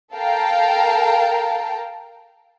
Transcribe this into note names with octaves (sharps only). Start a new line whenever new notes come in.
A4 A#4 F5 G5 A5 A#5